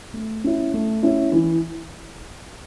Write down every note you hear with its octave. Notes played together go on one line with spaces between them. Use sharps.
A3
C#4 E4
A3
C#4 E4
E3